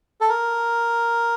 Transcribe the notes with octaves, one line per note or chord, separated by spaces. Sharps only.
A4
A#4